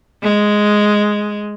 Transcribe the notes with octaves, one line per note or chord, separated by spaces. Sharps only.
G#3